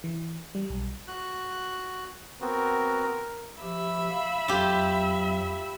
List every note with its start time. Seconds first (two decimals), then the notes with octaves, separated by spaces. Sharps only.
0.04 E3
0.55 G3
0.70 B1
1.08 F#4 F#6
2.41 B3 C4 F#4 A#4
3.62 F3 G4 E5 B5
4.10 F5
4.48 F2 F#3 F4 G4